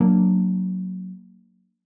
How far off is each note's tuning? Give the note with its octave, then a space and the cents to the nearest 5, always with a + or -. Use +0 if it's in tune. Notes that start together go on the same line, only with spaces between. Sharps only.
F#3 +0 A#3 -10 D4 +0